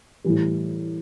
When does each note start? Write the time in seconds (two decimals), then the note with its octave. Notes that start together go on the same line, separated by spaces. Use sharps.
0.25 A2 E3 G3